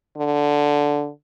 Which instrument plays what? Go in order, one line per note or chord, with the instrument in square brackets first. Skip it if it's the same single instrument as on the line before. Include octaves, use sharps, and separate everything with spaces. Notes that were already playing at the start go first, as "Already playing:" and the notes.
[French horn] D3